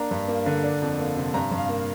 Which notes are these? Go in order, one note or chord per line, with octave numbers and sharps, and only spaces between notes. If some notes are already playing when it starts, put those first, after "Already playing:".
Already playing: A#3 D4 A#5
G2
A#3
D3
D4
F2
A#3
C3
G2 A#5
G2
F5
A#3